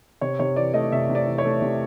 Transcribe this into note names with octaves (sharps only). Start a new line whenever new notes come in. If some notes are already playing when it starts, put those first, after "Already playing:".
C3 C#5
C3 C#5
E3 D5
A3 D#5
C3 E5
C3
D5
E3
C#5
A3
C3